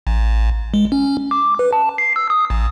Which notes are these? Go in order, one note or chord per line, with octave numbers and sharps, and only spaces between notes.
A1
G#3
C#4
D6
B4
A5
C7
E6
D#6
A1